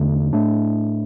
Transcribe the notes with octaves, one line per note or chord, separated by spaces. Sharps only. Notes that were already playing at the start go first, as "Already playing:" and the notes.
Already playing: E2 D3 A3
A2 A3 D4